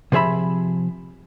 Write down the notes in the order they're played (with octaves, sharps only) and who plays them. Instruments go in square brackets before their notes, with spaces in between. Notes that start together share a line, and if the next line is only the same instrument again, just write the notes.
[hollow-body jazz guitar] C3 F3 G#4 E5 B5